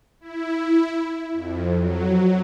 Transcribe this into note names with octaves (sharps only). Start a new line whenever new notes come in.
E4
F2
F#3